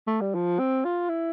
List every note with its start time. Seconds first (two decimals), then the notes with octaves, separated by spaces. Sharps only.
0.07 A3
0.21 G3
0.35 F3
0.59 C4
0.85 F4
1.09 E4